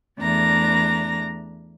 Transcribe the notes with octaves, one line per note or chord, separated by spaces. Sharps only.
E2 A3 D4 A#5 A#6